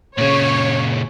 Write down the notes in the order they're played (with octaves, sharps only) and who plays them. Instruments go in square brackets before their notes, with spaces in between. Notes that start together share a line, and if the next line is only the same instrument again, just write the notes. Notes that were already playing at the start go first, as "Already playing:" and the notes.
[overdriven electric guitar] A#2 C#3 [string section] C#5